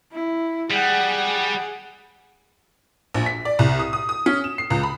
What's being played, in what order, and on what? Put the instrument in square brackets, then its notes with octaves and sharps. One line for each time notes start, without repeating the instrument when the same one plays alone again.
[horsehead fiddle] E4
[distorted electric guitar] G3 [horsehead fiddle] G#4 F#5
[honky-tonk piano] A#1
B6
D5
C2
D#6
D#6
D#6
C#4
E7
C7
C#2
B5